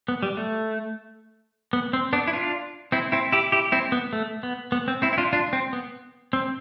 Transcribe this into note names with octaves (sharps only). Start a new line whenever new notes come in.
B3
G3
A3
B3
C4
B3 D4
E4
D4 F4
C4 E4
C4 E4
E4 G4
E4 G4
C4 E4
B3
A3
B3
B3
C4
C4 E4
E4
D4 F4
D4 F4
C4
B3
C4